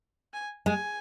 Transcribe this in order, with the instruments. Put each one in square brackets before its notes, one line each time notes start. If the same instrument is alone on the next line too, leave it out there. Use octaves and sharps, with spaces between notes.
[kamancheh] G#5
[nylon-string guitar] G#3 [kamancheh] G#5